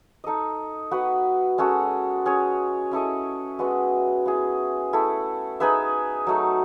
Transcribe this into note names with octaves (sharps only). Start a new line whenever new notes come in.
D#4 A4 D#5
B3 F#4 B4
G#3 C#4 F#4 A4
C#4 G#4 C#5
C#4 E4 A4 D#5
G#3 B3 F#4 B4
B3 E4 G#4
A3 E4 A4
D#4 G#4 B4 E5
F#3 A3 D#4